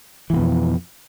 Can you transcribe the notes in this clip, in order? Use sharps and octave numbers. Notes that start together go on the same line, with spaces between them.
F2 G#2 B2 E3